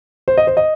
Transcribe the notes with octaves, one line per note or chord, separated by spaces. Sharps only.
C5
D#5
C5
D#5